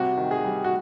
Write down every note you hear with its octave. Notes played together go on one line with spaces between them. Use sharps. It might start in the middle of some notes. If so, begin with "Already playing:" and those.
Already playing: C3 G3 F#4
D#3
G#4
G3
F#4